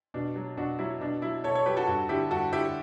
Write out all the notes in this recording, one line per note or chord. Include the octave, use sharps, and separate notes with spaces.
B2 D4
F#3
B2 D4 F#4
F#3 E4
B2 D4
F#3 E4
B2 A4 C#5
A4 C#5
F#3 G4 B4
F#4 A4
G2 F#4 A4
D3 G3 E4 G4
G2 F#4 A4
D3 G3 E4 G4